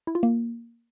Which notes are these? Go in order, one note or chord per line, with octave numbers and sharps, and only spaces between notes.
E4
F4
A#3